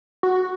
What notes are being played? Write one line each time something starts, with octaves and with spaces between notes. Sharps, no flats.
F#4